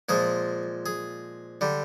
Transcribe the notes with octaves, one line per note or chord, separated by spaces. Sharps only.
A#2 F3 G#3 G#4
G#4
D3 G3